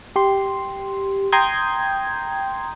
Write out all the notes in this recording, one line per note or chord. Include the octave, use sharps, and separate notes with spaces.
G4 C6
G5 A#5 C6 D#6 G6 G#6